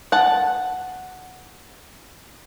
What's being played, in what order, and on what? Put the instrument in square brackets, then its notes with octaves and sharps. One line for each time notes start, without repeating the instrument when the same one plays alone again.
[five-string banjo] F#5 A5